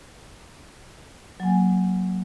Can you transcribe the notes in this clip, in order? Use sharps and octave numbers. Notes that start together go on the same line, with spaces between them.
F#3 A#3 G#5